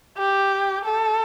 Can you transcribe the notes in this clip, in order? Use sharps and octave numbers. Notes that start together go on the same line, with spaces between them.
G4
A4